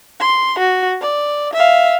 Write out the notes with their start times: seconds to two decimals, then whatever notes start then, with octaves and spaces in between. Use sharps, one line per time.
0.20 C6
0.59 F#4
1.02 D5
1.54 E5 F5